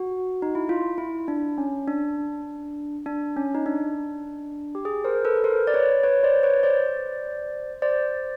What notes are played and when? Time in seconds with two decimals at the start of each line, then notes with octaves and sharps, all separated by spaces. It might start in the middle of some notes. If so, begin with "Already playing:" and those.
Already playing: F#4
0.42 D#4
0.55 E4
0.69 F4
0.98 E4
1.28 D4
1.58 C#4
1.88 D4
3.06 D4
3.37 C#4
3.55 D#4
3.66 D4
4.75 G4
4.85 G#4
5.04 A#4 C5
5.25 A4 B4
5.37 B4
5.44 A#4 C5
5.67 D5
5.74 B4 C#5
6.04 B4 C#5
6.23 C5 D5
6.43 B4 C#5
6.63 C5 D5
7.82 C5 D5